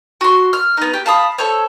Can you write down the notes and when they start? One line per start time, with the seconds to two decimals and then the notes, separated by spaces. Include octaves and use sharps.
0.21 F#4 C6
0.53 F6
0.77 B3 D#4
0.93 G4
1.06 F5 A5 B5 D#6
1.38 A4 C5 C#5